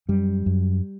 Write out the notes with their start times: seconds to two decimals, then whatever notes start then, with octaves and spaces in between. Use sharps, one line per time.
0.09 F#2 G3
0.46 F#2